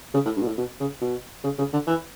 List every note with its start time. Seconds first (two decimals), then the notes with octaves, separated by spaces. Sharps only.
0.14 C#3
0.25 A2
0.36 G2
0.42 B2
0.47 A2
0.57 B2
0.80 C#3
1.01 B2
1.44 C#3
1.58 C#3
1.73 D3
1.87 E3